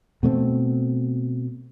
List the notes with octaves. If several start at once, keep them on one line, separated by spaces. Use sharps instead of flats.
B2 A3 B3 C4